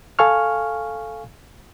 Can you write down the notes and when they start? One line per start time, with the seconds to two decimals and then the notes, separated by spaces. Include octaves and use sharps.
0.19 A4 F5 G#5 C#6 F6